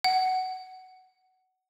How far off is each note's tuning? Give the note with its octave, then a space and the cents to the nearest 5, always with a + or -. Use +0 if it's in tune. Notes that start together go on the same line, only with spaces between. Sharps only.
F#5 +15